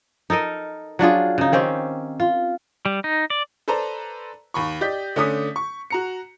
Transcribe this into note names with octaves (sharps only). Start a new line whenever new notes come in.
D#4 A4 A#4 D#5
F#3 D4 F4 G#4
C#3 D#4
D#3 C4 C#4 G4
F4
G3
D#4
D5
A4 B4 C5 D5 A5 A#5
D#2 B5 C#6
G4 D5 D#5 G6 B6
D3 A3 C#4 D6 D#6 B6
C#6
F#4 A#5 C#7